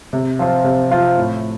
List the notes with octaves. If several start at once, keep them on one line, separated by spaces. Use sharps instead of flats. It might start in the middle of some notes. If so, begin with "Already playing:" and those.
C3
F3 C4 F4
C3
F3 C4 F4
A2